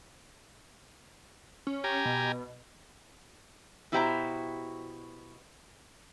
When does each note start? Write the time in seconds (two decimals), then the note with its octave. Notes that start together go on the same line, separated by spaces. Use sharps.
1.67 C#4
1.84 G4 G#5 A#5
2.05 B2
3.92 B2 E4 F#4 G4 C5 A#5